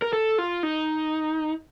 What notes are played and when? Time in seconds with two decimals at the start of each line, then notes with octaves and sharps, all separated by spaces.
0.02 A#4
0.13 A4
0.38 F4
0.63 D#4